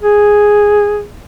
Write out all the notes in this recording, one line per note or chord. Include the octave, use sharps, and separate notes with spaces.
G#4